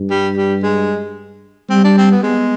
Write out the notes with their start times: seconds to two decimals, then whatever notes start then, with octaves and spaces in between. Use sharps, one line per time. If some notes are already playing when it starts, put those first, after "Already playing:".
Already playing: G2
0.10 G3
0.37 G3
0.63 G#3
1.70 G3 C4
1.84 D4
1.97 C4
2.11 B3
2.23 G#3 B3